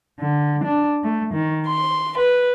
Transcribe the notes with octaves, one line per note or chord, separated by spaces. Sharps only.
D3
D4
A3
D#3
C6
B4